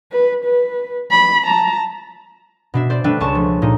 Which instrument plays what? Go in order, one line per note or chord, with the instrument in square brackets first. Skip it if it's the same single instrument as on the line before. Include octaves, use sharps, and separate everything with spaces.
[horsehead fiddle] B4
B4
B5
A5 A#5
[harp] B2 D4 E5
C5 D5
G3 A3 D4 B4 E5 G5
C#2 A5 C#6 E7
F3 A3
A#2 D#4